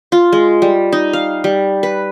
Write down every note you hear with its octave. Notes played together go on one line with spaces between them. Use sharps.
F4
G#3
G3
D#4
F5
G3
B4